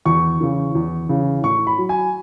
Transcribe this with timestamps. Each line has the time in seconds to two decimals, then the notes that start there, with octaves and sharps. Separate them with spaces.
0.05 E2 C#6
0.40 C#3 E3
0.75 E2
1.09 C#3 E3
1.44 A2 C#6
1.67 B5
1.78 F#3
1.89 G#5